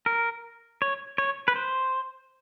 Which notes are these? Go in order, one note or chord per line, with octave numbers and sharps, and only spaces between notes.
A#4
C#5
C#5
B4
C5